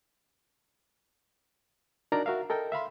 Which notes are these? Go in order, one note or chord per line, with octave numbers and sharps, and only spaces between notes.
D4 D#4 F#4 A#4 D5 A#5
F#4 A#4 E5 F5
A4 A#4 D#5 G5
E5 F5 B5 C6